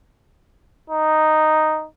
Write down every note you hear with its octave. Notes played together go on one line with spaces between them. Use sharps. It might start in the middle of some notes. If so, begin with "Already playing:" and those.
D#4